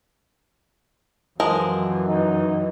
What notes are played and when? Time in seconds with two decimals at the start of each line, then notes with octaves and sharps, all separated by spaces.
1.40 F#2 E3 F3 G#3 A#4
2.08 D#4